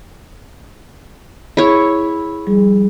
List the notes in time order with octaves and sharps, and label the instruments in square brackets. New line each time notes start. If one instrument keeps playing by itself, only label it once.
[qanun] E4 C#5 [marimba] G#4
[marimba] F3 G3 G#4